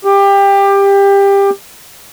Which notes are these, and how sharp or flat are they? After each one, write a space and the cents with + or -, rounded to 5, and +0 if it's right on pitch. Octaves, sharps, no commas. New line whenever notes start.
G4 +20